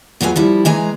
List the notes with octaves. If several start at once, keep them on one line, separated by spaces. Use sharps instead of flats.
E2 F#3 F4 B4 G#5
F3 G3 E4
E3 G#3 G#5 A#5